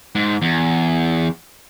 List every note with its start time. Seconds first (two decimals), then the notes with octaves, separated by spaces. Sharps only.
0.15 G#2
0.42 E2